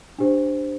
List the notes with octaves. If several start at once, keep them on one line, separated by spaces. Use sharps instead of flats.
D4 G4 C5